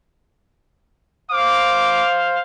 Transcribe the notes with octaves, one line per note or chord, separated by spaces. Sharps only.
C5 F5 D6